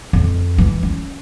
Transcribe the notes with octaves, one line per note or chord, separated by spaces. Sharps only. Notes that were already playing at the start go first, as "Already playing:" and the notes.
F2
E3
C#4